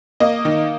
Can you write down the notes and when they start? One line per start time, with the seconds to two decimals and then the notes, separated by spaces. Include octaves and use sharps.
0.20 A#3 D#5
0.45 D#3